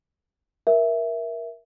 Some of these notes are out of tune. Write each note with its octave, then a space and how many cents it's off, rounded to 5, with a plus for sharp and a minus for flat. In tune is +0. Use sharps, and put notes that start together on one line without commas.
A#4 +20 E5 +0